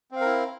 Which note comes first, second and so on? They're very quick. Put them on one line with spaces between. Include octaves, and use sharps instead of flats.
C4 F5 A#4 E4